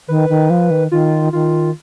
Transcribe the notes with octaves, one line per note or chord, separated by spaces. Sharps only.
D#3 B4
D#3
F3
D#3
D#3 F4
D#3 F4